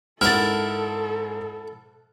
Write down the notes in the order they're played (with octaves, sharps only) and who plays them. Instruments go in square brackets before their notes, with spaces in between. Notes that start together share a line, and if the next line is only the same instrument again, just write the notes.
[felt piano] G#2 [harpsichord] E4 A#4 F#5 [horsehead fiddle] A4 [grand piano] F6 A6